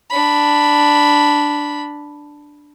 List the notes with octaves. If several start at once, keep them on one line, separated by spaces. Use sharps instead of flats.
D4 B5